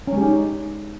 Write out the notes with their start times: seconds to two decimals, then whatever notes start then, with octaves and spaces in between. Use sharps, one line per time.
0.07 C#4
0.12 G#3
0.17 G4
0.22 D#4